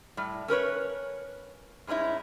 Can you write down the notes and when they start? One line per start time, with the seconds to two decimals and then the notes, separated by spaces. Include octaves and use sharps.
0.17 A2 G3
0.48 C#4 A#4 B4 C#5
1.87 G2 G#3 C#4 D#4 E4